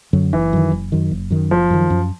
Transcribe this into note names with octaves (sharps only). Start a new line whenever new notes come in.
F#2 D3 F#3
F#1 E3
F#2 D#3
F#1
F#2 D#3
F#1
F#2 D#3
F#1 F3
F#2 D#3
F#2